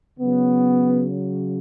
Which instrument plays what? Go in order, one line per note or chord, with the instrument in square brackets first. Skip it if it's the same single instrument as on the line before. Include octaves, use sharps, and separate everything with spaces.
[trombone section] C#3 F#3 B3